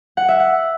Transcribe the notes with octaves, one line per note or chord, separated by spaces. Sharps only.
F#5
E5
F#5